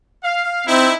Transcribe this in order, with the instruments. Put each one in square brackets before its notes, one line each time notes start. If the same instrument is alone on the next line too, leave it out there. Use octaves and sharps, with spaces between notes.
[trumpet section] F5
[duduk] C4 [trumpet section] D#4 E4